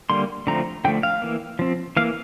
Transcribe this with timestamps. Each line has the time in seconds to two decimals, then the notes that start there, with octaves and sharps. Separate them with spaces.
0.10 D3 G3 A#3 C6
0.47 D3 F3 A3 C4 A#5
0.85 D3 F3 A3 G5
1.03 F5
1.22 E3 A#3
1.59 F3 C4
1.97 E3 A#3 F5